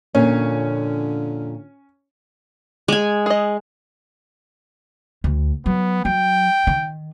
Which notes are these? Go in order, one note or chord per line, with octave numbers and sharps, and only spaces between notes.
F2 A#2 D3 C#4
G#3 G#5
G#4 D#5
D2
F#3 B3
F#3 G5
D#3